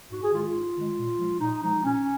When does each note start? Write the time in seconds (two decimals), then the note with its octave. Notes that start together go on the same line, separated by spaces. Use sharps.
0.11 G#2 F#4
0.22 G#4
0.32 D#3 G#3 F4
0.43 F4
0.54 G#2
0.76 D#3 G#3
0.98 A#2
1.18 F3 G#3
1.41 A#2 D#4
1.62 F3 G#3 D#4
1.84 A#2 C#4